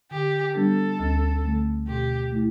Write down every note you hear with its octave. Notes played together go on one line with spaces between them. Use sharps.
D3 G4
G3 B3 D4 A4
D2
D3 A3
B2 G4
A3 E4